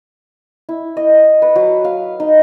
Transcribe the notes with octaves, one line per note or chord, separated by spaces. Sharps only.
E4
D#5
B4
F#3
F5
D#4